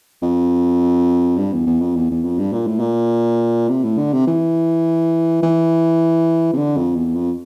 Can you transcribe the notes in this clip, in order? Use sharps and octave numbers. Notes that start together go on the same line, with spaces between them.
F2
G2
E2
E2
F2
E2
E2
F2
G2
A#2
A2
A#2
C3
A2
D3
C3
E3
E3
C3
D3
F2
E2
F2